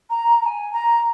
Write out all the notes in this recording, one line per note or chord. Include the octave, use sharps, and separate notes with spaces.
A#5
A#5
G#5
A#5